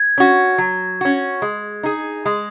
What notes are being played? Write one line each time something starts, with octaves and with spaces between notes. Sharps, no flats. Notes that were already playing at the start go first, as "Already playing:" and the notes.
Already playing: G#6
C#4 F#4
F#3
C#4 F#4
G#3
D#4 G#4
G#3